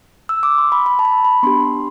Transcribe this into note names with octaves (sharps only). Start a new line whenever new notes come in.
E6
D6
C6
B5
B5
A5
B5
B5
B3 D4 G4 C6